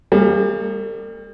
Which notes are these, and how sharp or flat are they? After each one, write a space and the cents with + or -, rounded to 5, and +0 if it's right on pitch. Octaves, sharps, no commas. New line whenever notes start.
G3 +35 A#3 -45 G#4 -20